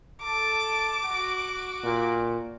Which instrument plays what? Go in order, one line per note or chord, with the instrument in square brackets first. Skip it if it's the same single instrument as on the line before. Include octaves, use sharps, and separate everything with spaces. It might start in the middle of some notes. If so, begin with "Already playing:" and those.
[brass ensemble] A4 A5 [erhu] D6
[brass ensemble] F#4
[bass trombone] A#2